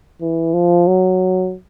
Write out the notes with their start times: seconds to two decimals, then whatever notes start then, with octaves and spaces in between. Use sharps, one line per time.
0.22 E3
0.54 F3
0.87 F#3